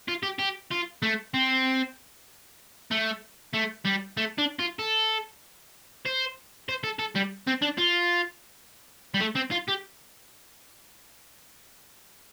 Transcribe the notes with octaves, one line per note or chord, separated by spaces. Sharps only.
F4
G4
G4
F4
A3
C4
A3
A3
G3
A3
D4
F4
A4
C5
C5
A4
A4
G3
C4
D4
F4
G3
A3
C4
F4
G4